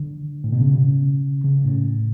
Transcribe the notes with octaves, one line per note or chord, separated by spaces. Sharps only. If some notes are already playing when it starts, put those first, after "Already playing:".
Already playing: D3
A2
B2
C#3
C#3
A2